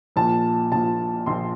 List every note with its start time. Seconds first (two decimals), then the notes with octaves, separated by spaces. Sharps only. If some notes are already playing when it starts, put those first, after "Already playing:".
0.16 A#1 A#2 F3 A5
0.71 A#1 A#2 F3 A5
1.26 A#1 A#2 F3 C6